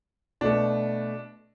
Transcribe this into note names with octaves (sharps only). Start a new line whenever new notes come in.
B2 A3 D4